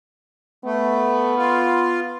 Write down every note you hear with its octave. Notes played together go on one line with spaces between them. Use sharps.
A3 B3
F4